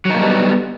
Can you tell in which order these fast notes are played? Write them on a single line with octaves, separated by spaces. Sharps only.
F#3 D#4 A#3 G3 B3